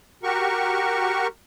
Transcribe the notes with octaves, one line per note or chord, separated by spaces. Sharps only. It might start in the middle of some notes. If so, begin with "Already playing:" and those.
F#4 G4 A#4 C#6